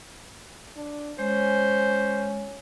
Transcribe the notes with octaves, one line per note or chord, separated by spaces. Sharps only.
D4
G#3 C#4 C5